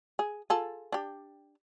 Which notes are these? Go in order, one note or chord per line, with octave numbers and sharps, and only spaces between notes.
G#4
F4 G#4 A4
D4 G4